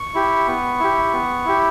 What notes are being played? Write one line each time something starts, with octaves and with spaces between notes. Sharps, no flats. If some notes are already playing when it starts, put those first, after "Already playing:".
Already playing: C#6
E4 G4
B3
E4 G4
B3
E4 G4